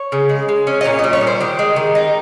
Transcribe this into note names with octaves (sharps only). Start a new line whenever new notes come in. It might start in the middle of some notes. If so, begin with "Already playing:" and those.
Already playing: C#5
C#3
G#3
G#3
C#4
D#5
A#2 C#5
G3 D#5
C#5
A#2
C5
D#3 G4
G#3
D#3
D#4